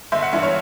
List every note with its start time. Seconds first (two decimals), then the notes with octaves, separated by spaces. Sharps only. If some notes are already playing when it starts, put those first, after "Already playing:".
0.12 G1 E5
0.23 F#5
0.33 G2 E3 E5
0.43 C#5